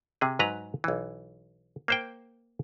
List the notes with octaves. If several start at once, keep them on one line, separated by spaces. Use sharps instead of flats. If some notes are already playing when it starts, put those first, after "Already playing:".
C3 G#4
G#2 F#3 B4 A#5
B1 E3
A#3 C5 G5